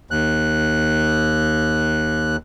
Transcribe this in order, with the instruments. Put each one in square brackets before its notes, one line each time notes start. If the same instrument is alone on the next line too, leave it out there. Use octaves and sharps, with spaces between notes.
[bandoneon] D#2 F#6